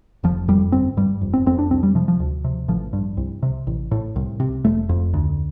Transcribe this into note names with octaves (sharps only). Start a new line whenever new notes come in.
F1 F3
F2 G3
G1 C4
G2 G3
F1
C4
F2 C4
D4
C2 C4
G3
C3 F3
F3
D2
C3
A1 F3
G2
C2
C3
A1
A2
C2
C3
F1 A3
F2
D2